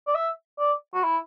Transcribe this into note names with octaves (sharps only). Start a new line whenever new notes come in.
D5
E5
D5
F#4
E4